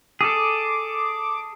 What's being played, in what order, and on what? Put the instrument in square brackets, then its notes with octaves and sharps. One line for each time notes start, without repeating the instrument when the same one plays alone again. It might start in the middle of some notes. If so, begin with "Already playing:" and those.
[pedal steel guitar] G#4 A4 [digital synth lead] D6